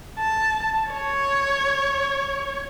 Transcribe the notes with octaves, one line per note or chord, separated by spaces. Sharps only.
A5
C#5